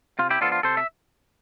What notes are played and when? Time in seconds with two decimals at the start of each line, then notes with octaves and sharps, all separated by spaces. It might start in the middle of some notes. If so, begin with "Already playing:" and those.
0.19 C3 F4
0.30 E4 G4
0.41 F3 B3 D4 F4 A4
0.52 F4
0.63 C3 A4 C5
0.77 E5